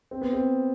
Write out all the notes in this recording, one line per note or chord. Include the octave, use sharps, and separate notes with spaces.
C4
B3
C4